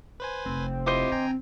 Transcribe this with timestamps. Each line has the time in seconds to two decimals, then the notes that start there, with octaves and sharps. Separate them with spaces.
0.20 B4 C5 G#5
0.45 F1 C4
0.86 E4 F4 G4 C5 D#5 D6
1.12 D3 G5 G#5 A#5